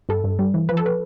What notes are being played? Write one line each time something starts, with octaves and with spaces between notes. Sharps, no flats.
G2 A4
G2
G3
E3
F3 B4
A4
B4